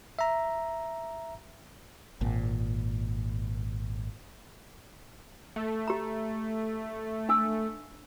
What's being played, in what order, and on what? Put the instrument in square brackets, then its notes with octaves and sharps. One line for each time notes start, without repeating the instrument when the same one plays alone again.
[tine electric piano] E5 A#5
[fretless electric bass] G#1 A#2
[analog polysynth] A3
[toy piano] G4 A#5
D4 G#5 E6